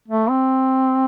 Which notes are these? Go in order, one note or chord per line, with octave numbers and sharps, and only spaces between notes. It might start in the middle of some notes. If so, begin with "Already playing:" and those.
A3
C4